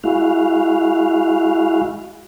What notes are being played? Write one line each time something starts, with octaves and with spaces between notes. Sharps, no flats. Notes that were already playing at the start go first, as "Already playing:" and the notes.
G#3 E4 F#4 F5